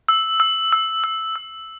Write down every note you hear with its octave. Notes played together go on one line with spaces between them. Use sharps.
E6
E6
E6
E6
E6